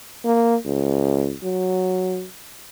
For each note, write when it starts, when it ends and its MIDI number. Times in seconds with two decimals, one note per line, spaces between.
0.25 0.56 58
0.65 1.34 37
1.43 2.25 54